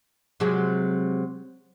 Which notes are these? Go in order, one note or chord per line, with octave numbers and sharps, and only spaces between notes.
C3 F#3 G#3